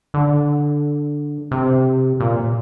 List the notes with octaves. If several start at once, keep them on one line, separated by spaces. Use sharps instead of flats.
D3
C3
A#2